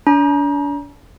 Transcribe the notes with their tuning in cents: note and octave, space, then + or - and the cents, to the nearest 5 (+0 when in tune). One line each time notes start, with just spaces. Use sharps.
D4 -40 A#5 +30